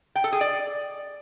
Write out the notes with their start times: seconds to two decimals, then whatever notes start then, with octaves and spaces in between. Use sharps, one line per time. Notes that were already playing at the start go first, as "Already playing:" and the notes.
0.16 G5
0.24 A4
0.32 G#4
0.41 D5